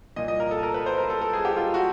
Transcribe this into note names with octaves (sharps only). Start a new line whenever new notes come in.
C2 A#2 F3 D#5
D#5
A#4
A4
A#4
B4
C5
A#4
A4
A4
G#4
G4
F4
F#4